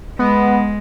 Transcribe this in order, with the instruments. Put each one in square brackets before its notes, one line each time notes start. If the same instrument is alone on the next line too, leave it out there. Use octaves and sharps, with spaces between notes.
[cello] G#3 [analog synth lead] B3